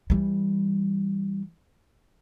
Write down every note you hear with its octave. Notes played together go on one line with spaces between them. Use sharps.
E3 G3